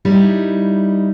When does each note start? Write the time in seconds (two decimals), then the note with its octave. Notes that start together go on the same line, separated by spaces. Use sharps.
0.05 G3 D#4 E4